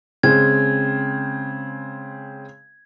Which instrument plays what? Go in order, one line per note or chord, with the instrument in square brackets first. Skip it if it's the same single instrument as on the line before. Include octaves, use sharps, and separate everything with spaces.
[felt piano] C#3 G#3 C4 [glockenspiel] G#6